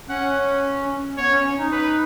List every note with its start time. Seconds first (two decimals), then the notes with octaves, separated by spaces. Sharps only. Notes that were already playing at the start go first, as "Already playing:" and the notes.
0.09 C#4 F#5
1.17 B3 C#5
1.32 C#4
1.44 C#4
1.58 D#4
1.72 B4